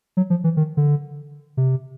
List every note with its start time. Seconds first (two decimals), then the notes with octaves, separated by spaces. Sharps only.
0.17 F#3
0.30 F3
0.44 E3
0.57 D#3
0.77 D3
1.57 C3